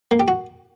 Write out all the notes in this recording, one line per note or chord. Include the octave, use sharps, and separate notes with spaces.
A#3
G4
F#4